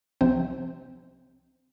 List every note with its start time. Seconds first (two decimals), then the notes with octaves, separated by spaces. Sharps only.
0.21 C2 C3 F3 C4 C5